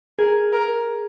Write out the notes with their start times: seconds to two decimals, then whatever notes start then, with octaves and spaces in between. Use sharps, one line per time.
0.19 G#4 A#4
0.53 A#4